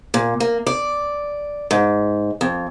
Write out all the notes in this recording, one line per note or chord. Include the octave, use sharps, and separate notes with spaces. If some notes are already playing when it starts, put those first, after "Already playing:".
A#2
A#3
D5
G#2
F2